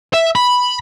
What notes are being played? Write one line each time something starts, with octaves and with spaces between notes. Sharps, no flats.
E5
B5